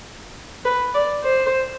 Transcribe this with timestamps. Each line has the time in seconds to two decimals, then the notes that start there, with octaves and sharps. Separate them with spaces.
0.65 B4
0.94 D5
1.23 C5